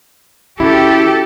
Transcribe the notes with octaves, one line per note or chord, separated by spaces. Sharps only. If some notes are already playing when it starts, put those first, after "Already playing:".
D#3 C#4 E4 F#4 G4 A4